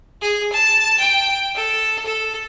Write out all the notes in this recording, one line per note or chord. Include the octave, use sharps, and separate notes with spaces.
G#4
A5
G5
A4
A4